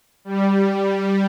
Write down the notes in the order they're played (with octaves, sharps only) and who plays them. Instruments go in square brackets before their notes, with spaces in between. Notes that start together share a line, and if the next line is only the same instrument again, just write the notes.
[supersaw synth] G3